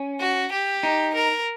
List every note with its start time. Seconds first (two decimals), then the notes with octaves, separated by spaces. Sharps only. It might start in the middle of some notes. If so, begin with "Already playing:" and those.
Already playing: C#4
0.20 F#4
0.52 G4
0.83 D#4
1.15 A#4